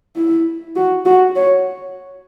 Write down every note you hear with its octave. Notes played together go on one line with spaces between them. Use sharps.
E4
F#4
F#4
C#5